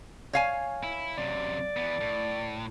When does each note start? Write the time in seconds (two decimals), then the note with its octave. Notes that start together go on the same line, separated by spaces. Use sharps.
0.33 C#5 F5 G#5
0.83 E4
1.18 F#2 C3 D5
1.77 E2 B3
2.01 A2